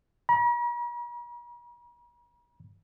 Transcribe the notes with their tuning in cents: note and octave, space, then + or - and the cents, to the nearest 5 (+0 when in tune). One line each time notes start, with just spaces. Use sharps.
A#5 +45